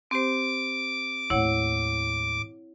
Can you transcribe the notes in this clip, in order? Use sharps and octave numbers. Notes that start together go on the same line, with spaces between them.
C4 G4 C5 D6
D#2 A2 E4 C#5 F#5